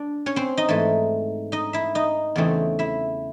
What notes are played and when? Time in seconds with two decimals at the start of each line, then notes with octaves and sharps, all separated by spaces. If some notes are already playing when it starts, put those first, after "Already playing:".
Already playing: D4 D5
0.26 C#4 C#5
0.36 C4 C5
0.57 D#4 D#5
0.69 G#2 E3 A3
1.52 D#4 D#5
1.73 E4 E5
1.95 D#4 D#5
2.36 E2 C#3 E3 A3 C4
2.79 E4 E5